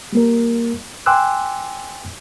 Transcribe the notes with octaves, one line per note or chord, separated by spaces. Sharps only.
G3 A#3 A#4
G5 G#5 C6 D6 E6 F#6